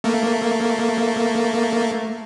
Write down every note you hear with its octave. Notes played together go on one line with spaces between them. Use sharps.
A3 A#3